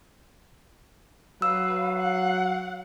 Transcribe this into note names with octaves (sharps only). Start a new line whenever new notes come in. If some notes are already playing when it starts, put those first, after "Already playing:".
F#3 B4 F5 E6
F#5